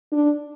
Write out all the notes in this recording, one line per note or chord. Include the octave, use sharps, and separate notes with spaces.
D4